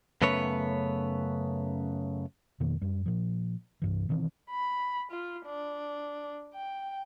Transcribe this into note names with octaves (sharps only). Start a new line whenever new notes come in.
F#2 C#3 A3 B3 B4 C#5
F2 B2 D#3 A#3
F#2 G3
A#2 F3
C2 G2 E3
B2 D#3 E3 C4
B5
F4
D4
G5